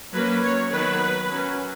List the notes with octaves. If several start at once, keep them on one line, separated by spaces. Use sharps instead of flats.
F#3 A#3 C#4 B4
C#5
D#3 F#3 B3 B4
F#3 C#4